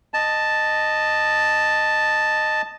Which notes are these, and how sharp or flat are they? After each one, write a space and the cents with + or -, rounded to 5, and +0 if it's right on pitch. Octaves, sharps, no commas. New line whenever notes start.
D#5 -10 A5 +0